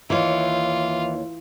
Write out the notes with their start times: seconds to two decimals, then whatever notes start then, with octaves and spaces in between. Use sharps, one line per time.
0.10 D#2 E3 F4 C#5